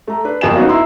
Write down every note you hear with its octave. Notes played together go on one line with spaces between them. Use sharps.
A3 A#5
D4 B4
G1 F2 A#3 G#5 E7
B3 C#4 D#4 F#4 D#5 F5
E4 A#5 C6 E6